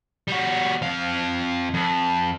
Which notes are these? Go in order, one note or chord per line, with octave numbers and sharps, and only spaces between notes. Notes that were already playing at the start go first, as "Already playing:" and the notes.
G3 F#4
F2 F5
F2